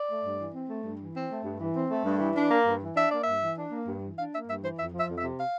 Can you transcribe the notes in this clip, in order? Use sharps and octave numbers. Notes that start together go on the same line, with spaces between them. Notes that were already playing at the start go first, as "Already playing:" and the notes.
Already playing: D5
A3
G2
E3
C4
A3
G2
E3
C4
A3
G2
E3
C4
A3
G2
E3
D4
A#3
G2
E3
D4 E5
A#3 D5
G2 E5
E3
D4
A#3
G2
E3
D4 F5
A#3 E5
G2 E5
E3 C5
F2 E5
F3
E5
F2
E5
C3
F5